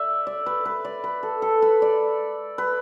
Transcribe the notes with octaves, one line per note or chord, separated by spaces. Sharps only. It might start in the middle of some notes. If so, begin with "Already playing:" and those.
Already playing: D5 E5
D5
B4
B4
D5
B4
A4
A4
B4
D5
B4